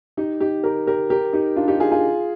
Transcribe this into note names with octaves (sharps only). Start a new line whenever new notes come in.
D#4 G4
D#4 G4
G4 A#4
G4 A#4
G4 A#4
D#4 G4
D4 F4
D#4 G4
F4 G#4
F4 G#4